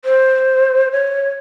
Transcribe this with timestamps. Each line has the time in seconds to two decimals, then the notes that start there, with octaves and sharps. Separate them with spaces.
0.05 C5
0.92 C#5